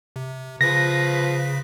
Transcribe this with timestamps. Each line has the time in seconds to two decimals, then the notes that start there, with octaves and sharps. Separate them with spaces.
0.16 C3
0.61 C#3 F3 B4 A#6 B6